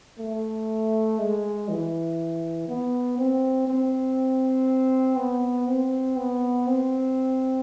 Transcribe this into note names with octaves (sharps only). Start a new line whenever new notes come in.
A3
G#3
E3
B3
C4
C4
B3
C4
B3
C4